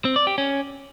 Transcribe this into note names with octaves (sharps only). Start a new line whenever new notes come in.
C4
D5
G4
C#4